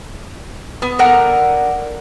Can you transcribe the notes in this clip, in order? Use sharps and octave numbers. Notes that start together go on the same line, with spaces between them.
B3
D3 A#4 F#5 A#5